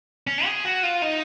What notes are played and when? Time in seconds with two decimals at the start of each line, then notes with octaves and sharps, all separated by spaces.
0.27 C#4
0.46 G#4
0.65 F#4
0.83 F4
1.02 D#4